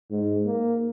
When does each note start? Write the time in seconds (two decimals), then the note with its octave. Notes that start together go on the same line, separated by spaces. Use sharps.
0.10 G#2
0.45 A#3